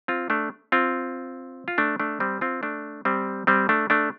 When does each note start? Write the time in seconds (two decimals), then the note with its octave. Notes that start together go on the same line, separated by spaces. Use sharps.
0.08 C4 F4
0.30 A3 D4
0.72 C4 F4
1.68 F4
1.78 A3 D4
2.00 A3 D4
2.20 G3 C4
2.41 C4 F4
2.63 A3 D4
3.05 G3 C4
3.47 G3 C4
3.69 A3 D4
3.90 A3 D4